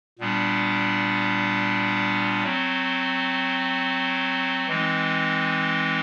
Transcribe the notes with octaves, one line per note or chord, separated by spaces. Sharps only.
A#2 G3 B3 D4
F#3 A3 C4
E3 G#3 C4 D#4